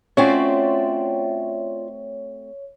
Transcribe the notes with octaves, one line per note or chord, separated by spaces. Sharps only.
A3 C4 C#4 F4 F#4 C#5 D5 E5